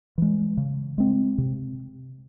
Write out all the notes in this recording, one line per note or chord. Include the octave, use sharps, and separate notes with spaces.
E3 G#3
C#3
G#3 C4
C3